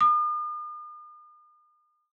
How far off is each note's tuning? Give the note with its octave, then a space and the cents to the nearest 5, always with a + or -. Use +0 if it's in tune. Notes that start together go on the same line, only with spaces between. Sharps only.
D#6 -45